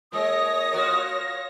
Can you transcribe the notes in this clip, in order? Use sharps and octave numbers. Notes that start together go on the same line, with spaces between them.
A#2 G#3 C#5 D#6 A#6
F4 F#4 A#4